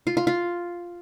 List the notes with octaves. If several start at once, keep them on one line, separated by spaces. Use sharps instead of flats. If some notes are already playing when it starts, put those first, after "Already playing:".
F4
F4
F4